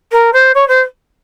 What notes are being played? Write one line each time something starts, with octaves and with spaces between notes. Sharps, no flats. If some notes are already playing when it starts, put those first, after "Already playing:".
A#4
C5
C#5
C5